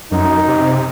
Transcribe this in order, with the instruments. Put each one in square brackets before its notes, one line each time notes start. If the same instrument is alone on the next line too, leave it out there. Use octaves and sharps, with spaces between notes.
[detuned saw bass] F#2 [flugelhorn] D#4
[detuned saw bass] C3